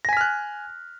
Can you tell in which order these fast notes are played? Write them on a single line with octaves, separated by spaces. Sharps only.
A#6 G#5 B6 F6 F#6